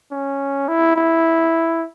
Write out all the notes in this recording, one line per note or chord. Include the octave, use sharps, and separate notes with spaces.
C#4
E4
E4